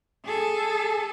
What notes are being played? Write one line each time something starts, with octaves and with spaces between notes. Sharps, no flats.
G#4 A4